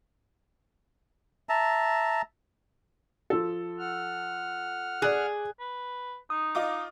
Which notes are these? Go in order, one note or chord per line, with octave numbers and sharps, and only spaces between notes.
E5 A5 A#5
F3 A4
F#5 F6
G#4 D5 F#6
B4
D#4 D#6
F4 D#5 D6